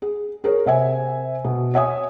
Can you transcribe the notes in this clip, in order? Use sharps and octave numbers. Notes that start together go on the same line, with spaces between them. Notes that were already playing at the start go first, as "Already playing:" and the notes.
G#4
G#4 A#4 C#5
C3 E5 G#5
B2
C#5 E5 G#5 D#6